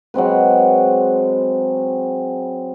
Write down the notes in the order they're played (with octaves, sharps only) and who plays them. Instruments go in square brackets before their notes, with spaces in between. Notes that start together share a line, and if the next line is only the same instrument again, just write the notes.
[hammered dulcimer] F#3 G#3 C4 B4